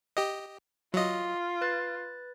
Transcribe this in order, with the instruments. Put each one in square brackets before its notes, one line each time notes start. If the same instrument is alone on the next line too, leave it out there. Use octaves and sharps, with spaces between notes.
[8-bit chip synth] G4 D#5
[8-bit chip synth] F#3 D#5 [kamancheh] F4
[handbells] B4 F#6 A6